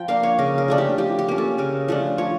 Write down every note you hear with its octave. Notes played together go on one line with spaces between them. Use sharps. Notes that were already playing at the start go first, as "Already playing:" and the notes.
Already playing: F3 G5
A#3 D4 F5
C#5
C#3 A#4
A#4
F3 A3 D4
G4
F3 G4
G4
A#3 C#4
A4
C#3 A#4
F3 A3 D4
F3 C#5